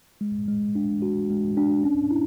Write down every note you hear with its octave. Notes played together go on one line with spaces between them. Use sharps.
G#3
G#3
D4
F#4
G#3
D4
C#4
E4